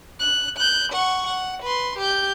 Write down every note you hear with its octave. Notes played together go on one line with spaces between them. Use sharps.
F#6
F#6 G6
F#5 C#6
F#5
B4 C6
G4 G6